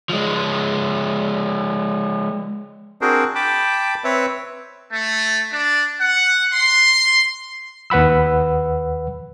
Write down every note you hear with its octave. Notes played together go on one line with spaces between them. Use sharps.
F3 G#3
C4 D4 F#4 G#4 A#4 C5
G5 A5 B5 D6
C4 B4 C#5 E5
A3
D4
F#5
C6
D#2 B4 F#5 B5 E6